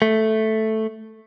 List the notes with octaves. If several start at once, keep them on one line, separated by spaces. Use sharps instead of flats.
A3